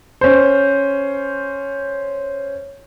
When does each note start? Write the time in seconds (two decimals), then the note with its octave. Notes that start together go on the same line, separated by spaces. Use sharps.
0.21 C#4 C5